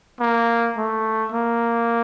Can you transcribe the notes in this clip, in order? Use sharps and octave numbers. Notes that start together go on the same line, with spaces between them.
A#3
A3
A#3